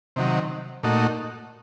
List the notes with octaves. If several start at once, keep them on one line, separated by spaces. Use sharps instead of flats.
C3 D#3 F#3
A#2 A3 D#4 F#4